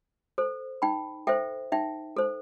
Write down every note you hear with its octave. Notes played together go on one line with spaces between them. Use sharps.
A4 C5
D#4 G5 B5
A4 C5 E5 G5
D#4 E5 G5
A4 C5